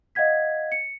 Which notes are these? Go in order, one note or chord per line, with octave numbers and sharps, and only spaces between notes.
D#5 F5 F#5 G#6 B6
C#7